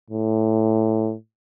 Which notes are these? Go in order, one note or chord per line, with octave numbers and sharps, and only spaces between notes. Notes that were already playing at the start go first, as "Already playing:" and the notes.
A2